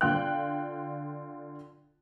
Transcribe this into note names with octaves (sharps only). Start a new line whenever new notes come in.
D3 F4 G5 F#6